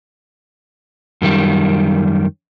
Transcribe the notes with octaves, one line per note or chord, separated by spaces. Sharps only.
F#2 D#3 G3